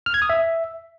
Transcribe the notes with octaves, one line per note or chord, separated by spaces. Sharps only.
F6
G#6
D#6
E5